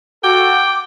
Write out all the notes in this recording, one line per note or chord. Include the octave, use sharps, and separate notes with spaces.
F#4 A4 G5 D6